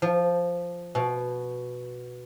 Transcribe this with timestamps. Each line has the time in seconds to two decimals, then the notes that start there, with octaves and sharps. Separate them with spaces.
0.02 F3
0.95 B2